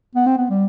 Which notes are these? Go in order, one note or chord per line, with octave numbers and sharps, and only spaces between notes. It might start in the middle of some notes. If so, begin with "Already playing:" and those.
B3
C4
B3
G3